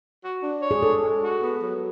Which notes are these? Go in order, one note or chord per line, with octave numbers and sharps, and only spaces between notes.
F#4
D4
C#5
G#4
D4 A4
G#3
F#4
B3
F#3